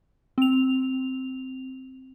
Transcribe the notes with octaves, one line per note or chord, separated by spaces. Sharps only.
C4 F7